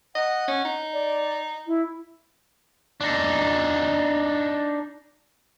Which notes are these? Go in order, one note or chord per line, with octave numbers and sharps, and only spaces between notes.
D#5 F#5
C#4
D#4
D5
E4
D4 D#4